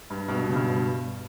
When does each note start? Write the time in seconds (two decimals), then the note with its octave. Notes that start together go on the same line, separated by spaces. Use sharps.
0.10 G2
0.28 G2 B2
0.49 C#3
0.55 G2 B2